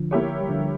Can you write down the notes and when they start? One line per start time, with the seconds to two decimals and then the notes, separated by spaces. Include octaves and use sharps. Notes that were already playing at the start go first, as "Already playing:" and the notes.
Already playing: D3 F3
0.11 A#3 E4 G4 C#5
0.41 G3
0.49 D3 F3